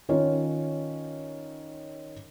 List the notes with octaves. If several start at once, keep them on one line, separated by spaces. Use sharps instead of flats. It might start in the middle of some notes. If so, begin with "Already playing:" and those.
D#3 C#4 F4 C#5